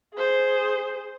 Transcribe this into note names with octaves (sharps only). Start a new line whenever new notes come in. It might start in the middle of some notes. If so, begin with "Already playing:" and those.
G#4 C5